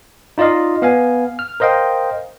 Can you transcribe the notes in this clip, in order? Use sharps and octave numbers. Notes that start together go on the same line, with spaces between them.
D#4 F4 D5 D#5 F5
B3 F5 G#5
F6
A#4 C5 D#5 F5 G5